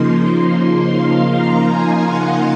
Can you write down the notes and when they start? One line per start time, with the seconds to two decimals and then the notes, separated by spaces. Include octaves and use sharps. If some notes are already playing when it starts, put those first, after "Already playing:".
Already playing: C#3 F3 A#3 D#4 C6
0.88 F5
1.27 A#5
1.67 G#5
2.07 F#5